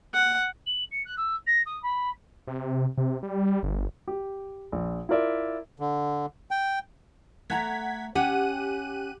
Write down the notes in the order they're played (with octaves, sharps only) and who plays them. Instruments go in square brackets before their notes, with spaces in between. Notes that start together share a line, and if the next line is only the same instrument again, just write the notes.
[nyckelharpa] F#5
[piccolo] F#7
C#7
F#6
E6
A#6
D#6
B5
[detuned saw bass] C3
C3
G3
G1
[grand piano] G4
A#1
E4 F4 A#4 D5 E5
[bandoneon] D3
G5
[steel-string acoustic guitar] A3 A5 A#5 [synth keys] F#5 G#6 B6
[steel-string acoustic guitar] C#4 F#5 [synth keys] G4 F#6 D#7